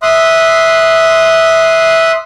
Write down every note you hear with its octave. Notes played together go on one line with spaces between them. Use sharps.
E5 C6 D#6 F#6